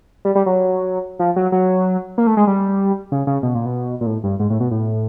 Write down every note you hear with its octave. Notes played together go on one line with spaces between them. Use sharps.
G3
G3
F#3
F3
F#3
F#3
A#3
A3
G#3
G3
C#3
C#3
B2
A#2
B2
A#2
A2
G2
G#2
A2
B2
A2